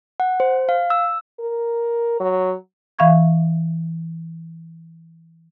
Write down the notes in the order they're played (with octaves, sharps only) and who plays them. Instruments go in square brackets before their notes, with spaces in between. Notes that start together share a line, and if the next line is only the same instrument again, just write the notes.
[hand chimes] F#5
C5
F5
E6
[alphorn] A#4
F#3
[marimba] E3 E5 F5 B5 C#6 G#6